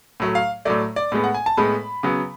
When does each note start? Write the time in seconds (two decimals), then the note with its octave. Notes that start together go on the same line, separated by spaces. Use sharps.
0.20 A2 F#3 A3
0.35 F5
0.65 A2 F#3 A3 D5
0.96 D5
1.12 A2 G#3 B3
1.24 F#5
1.34 G#5
1.46 A5
1.57 A2 G#3 B3 B5
2.03 C#3 F#3 B3